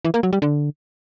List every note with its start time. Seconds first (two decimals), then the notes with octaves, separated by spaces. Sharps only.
0.05 E3
0.14 A#3
0.23 F#3
0.33 G3
0.42 D3